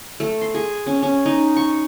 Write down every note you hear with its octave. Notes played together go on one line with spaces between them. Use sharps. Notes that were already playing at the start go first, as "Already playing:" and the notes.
A3
C6
G#4
C#4
C#4
D#4
C#6